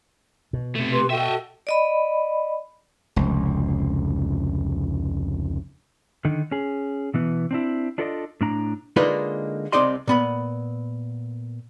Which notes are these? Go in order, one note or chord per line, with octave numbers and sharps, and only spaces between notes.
B2
C3 A3
G4 B4 C6
F#4 A4 D#5 E5 G5
D5 D#5 B5
F1 C#2
D3 D#3 D#4
C#4 G#4
B2 E3 B3
C4 D4 E4
D4 F4 A4 B4 D5 D#5
A2 D4 A#5
D3 G#3 A#3 D#4 F4 B4
C2 C3 D#4 D5 D#5 C6
A#2 B3 B5